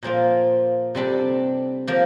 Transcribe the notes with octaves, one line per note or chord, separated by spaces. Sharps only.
A#2 F3 A#3 F4
C3 G3 D4 A4
F3 A#3